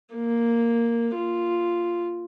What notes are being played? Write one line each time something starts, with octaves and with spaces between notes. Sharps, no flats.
A#3
F4